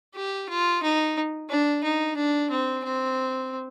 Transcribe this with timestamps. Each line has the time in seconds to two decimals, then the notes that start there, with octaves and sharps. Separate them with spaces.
0.16 G4
0.49 F4
0.83 D#4
1.49 D4
1.84 D#4
2.17 D4
2.51 C4
2.85 C4